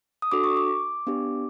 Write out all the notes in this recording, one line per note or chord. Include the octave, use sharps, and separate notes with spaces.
D#6
D4 F#4 A4 D6
C#6
D6
B3 D4 G4